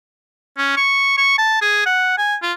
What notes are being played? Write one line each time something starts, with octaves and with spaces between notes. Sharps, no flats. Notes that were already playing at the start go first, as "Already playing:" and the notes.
C#4
C#6
C#6
A5
G#4
F#5
G#5
F4